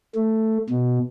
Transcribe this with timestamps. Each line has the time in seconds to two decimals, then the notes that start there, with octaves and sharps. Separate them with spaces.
0.15 A3
0.69 B2